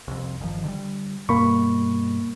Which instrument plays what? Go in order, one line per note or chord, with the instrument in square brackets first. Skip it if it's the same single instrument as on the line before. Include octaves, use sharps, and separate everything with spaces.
[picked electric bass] C2 F2
G1 D#3 F3
D3 F3 G3
[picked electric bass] G2 B2 G3 [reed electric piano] A#3 B5 C#6